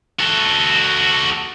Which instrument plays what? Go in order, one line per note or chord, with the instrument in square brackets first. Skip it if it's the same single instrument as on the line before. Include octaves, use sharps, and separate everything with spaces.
[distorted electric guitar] F#4 A4